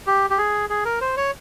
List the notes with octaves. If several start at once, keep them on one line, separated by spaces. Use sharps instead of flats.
G4
G4
G#4
G#4
A#4
C5
C#5